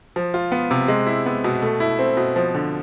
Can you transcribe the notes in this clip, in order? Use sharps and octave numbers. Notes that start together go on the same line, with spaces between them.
F3
F4
B3
C3
G#3
E4
B3
B2
A3
E4
C4
B2
F3
D3